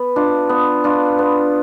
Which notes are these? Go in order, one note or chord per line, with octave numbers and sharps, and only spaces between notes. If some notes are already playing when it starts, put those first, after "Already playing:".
Already playing: B3
D4 F4
B3
D4 F4
B3